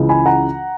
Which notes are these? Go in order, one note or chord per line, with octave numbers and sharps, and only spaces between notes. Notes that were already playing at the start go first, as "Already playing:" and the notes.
Already playing: C#2 C#3 E3
G#5 B5
F#5 A#5